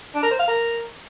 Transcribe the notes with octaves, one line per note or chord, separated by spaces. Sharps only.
D4
A#4
C5
F5
A#4